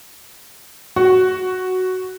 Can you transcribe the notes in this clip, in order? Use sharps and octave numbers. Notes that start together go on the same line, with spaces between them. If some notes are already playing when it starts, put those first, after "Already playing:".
F#4